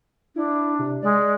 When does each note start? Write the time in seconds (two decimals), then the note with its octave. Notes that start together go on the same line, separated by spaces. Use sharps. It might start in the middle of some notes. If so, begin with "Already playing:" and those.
0.36 D4 E4
0.79 C3
1.03 G#3 D5